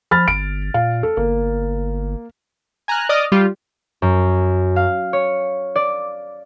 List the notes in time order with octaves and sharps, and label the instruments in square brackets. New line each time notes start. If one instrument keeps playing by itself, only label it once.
[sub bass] F3 [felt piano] B5 F6 A6
[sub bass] G1 [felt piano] D7
[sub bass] A#2 [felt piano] F5
[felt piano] A4
[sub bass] G1 [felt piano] A#3
[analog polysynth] G#5 A#5 F6 F#6
D5 D#5 D6 D#6 F6
G3 F4 G4
[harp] F#2
F5
C#5
D5